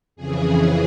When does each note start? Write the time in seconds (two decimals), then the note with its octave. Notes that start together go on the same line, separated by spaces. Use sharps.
0.16 F2 C#3 E3 G#4
0.46 G#4